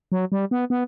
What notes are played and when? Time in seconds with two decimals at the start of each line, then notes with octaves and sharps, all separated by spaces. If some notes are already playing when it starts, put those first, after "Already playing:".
0.12 F#3
0.32 G3
0.51 B3
0.70 B3